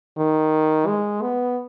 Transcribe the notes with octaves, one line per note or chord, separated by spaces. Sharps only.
D#3
G#3
B3